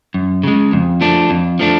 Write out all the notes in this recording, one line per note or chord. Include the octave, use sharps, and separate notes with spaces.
F#2
C#3 G#3
F2
F3 A3 D4
F2
F3 A3 D4